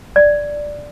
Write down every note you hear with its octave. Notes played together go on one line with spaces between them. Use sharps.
D5